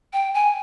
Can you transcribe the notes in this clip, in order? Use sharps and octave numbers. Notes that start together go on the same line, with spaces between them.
G5
G#5